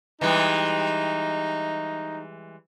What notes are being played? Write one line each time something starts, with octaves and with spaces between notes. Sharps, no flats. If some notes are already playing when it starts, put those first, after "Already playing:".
E3 G3 G#3 D#4